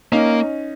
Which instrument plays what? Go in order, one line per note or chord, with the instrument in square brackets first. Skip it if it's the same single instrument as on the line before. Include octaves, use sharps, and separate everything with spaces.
[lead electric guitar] A#3 [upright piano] C#4 D#4